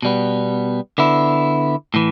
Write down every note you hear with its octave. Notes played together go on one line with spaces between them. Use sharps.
B2 G3 B3
D3 B3 E4
A2 E3